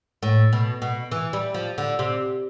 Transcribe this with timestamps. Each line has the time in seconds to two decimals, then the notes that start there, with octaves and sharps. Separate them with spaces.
0.23 A2
0.53 B2
0.82 B2
1.12 E3
1.33 G3
1.55 F3
1.78 D3
1.99 C3